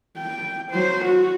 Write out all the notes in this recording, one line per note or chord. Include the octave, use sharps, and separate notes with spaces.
G5
F#3 C5
F#4